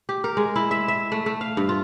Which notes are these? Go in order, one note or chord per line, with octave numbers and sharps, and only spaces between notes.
G4
A#4
G#3
E4
E5
E5
A3
A3
F5
G2
F4